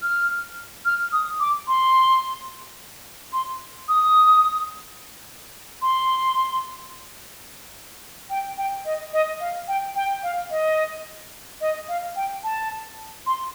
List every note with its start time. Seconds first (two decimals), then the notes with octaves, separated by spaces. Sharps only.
0.02 F6
0.85 F6
1.13 D#6
1.40 D6
1.68 C6
3.33 C6
3.89 D#6
5.82 C6
8.30 G5
8.58 G5
8.85 D#5
9.13 D#5
9.40 F5
9.68 G5
9.96 G5
10.23 F5
10.51 D#5
11.61 D#5
11.89 F5
12.16 G5
12.44 A5
13.27 C6